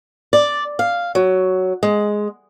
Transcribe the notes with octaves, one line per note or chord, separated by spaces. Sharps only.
D5
F5
F#3
G#3